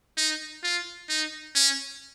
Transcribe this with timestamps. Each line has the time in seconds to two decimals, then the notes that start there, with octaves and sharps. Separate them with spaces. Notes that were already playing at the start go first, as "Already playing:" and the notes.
0.17 D#4
0.63 F4
1.09 D#4
1.55 C#4